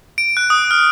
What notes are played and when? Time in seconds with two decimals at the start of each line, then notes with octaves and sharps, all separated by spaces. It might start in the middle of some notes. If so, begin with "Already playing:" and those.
0.18 D7
0.37 F#6
0.50 D#6
0.71 F6